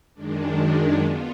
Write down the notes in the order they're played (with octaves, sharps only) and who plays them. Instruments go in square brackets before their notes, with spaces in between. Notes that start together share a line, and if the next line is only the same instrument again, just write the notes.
[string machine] F#2 D#3 G#3 D4
B3 F4